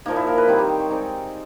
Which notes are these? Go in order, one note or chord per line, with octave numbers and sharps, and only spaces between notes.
A#2 F3 A#3 D#4
E4
A#4
B4
D#3 G3 C4 D#4 C5
G4
C5
C#5
G#3 C4 D#4 D5